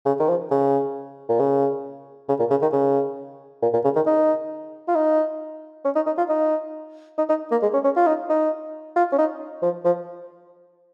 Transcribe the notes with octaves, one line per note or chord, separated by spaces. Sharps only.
C#3
D#3
F3
C#3
A#2
C#3
C#3
A#2
C#3
D#3
C#3
A#2
A#2
C#3
D#3
D#4
F4
D#4
C#4
D#4
D#4
F4
D#4
D#4
D#4
A#3
G#3
C#4
C#4
F4
D#4
D#4
F4
C#4
D#4
F3
F3